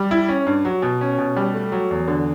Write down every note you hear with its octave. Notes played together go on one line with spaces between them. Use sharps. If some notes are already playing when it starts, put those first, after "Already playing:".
Already playing: G3
E4
C#4
G2
F#3
B2
C#4
B2
G3
A3
F#3
E2
D3